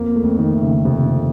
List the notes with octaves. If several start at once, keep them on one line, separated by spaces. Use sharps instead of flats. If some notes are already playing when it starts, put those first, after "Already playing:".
Already playing: F2 A#3
A3
F2
D#3
A3
C#3
F2 C3